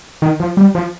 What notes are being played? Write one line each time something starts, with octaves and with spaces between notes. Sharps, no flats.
D#3
F3
G3
F3